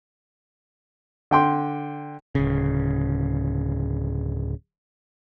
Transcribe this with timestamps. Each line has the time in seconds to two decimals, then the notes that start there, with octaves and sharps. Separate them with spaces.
1.31 D3 G5 C6
2.35 D1 C#3